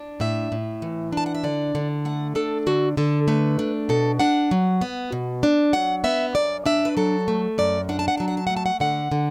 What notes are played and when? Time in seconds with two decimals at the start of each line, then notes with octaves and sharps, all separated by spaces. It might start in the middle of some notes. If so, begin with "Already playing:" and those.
Already playing: D4
0.20 A2 E5
0.52 A2
0.82 E3
1.12 D4 A5
1.26 F#5
1.35 E5
1.43 D3 D5
1.75 D3
2.05 A3 F#5
2.35 D4 A4
2.67 D3 F#4
2.97 D3 A4
3.28 A3 B4
3.59 D4
3.89 B2 A4
4.19 D4 F#5
4.51 F#3
4.81 B3
5.12 B2
5.43 D4
5.73 F#3 F#5
6.04 B3 E5
6.35 F#2 D5
6.66 D4 E5
6.85 B4
6.97 F#3 A4
7.28 A3
7.58 F#2 D5
7.89 D4 F#5
7.99 A5
8.08 F#5
8.17 F#3 A5
8.28 F#5
8.37 A5
8.47 A3 F#5
8.57 A5
8.66 F#5
8.80 D3 F#5
9.12 D3